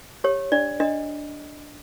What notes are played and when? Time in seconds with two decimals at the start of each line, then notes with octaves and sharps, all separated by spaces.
0.24 G4 C#5
0.52 D4 D5
0.80 D4 D#5